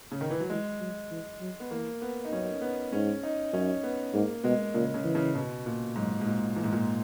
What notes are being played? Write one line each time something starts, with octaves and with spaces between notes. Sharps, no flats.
C#3
D#3
E3
F#3
E3 G#3
F#3
E3
F#3
B3
E3 A#3
B3
D#4
F#2 C#4
B3
G#2 C#4
D#4
F#2 C#4
B3
G#2 A#3
B2 G#3
A#2 C#3
C#3
E3
C#3
B2
A#2
G#2 F#3
G#2
A#2
A#2 E3
G#2
A#2